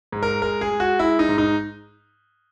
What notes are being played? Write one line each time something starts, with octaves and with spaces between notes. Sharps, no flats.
G#2
A#4
G#3 A#4
G#4
G#3
F#4
G#3 E4
D#4
G#2
D#4